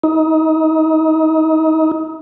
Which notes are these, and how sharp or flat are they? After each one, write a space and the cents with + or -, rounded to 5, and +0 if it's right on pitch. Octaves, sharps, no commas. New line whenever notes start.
D#4 +30